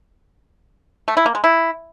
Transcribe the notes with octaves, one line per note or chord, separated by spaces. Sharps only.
A3
E4
A#3
G#3
E4